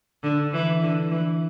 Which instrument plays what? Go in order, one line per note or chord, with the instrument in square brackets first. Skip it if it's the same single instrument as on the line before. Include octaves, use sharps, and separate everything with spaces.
[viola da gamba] D3
E3
D3
E3